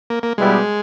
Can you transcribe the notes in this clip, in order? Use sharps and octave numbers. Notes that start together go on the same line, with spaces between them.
A#3
A#3
B2 G3 G#3 B3 E4 G4